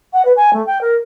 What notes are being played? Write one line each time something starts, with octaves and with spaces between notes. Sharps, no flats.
F#5
B4
G#5
A3
G5
A#4